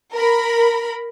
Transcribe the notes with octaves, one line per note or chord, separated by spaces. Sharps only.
A#4 B5